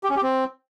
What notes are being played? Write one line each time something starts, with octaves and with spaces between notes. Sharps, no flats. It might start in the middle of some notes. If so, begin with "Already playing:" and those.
G4
C#4
G4
C4